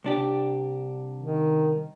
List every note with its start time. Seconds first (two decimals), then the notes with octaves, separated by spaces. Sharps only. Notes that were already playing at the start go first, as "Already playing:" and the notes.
0.04 C2 D4 G4
1.20 D#3